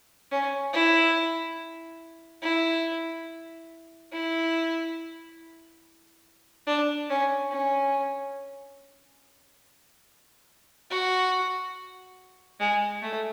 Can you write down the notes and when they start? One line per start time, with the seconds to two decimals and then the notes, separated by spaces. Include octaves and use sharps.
0.32 C#4
0.73 E4
2.42 E4
4.12 E4
6.67 D4
7.10 C#4
7.51 C#4
10.90 F#4
12.60 G#3
13.02 A3